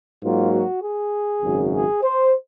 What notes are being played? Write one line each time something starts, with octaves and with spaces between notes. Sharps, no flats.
G#2 F#3 A#3 F4
F#4
G#4
G#1 F#2 C#3
G#4
C5